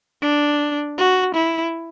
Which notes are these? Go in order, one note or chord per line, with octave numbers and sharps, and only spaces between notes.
D4
F#4
E4